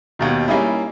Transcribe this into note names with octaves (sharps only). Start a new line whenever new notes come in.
D#2 B2 D#3
G3 A#3 C#4 D#4 E4